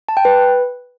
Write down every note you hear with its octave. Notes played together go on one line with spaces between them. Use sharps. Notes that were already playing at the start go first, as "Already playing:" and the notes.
A5
G5
B4